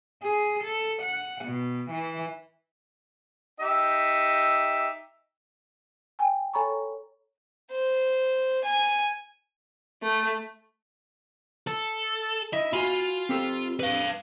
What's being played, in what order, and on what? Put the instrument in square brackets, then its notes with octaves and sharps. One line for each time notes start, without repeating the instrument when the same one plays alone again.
[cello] G#4
A4
F#5
B2
E3
[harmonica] D#4 G4 E5
[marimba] G5 G#5
A4 C#5 G#5 A#5 B5 C#6
[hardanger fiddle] C5
G#5
[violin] A3
[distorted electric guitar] A4
[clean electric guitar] E4 D#5 [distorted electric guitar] E5
[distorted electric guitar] F4 [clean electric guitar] F#4 G#5 B5
[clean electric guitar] C4 G4 A4
[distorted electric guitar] B4 F5